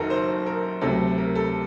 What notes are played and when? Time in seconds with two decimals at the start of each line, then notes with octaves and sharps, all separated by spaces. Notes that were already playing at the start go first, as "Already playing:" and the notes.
Already playing: F#1 F#2 D#3 D#4 F#4 A4 A#4
0.10 C5
0.46 A#4
0.81 D2 C3 F#3 A4
1.18 A#4
1.36 A4